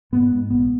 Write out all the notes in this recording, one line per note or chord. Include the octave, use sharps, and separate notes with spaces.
G#2 B3
G#2
A#1 B3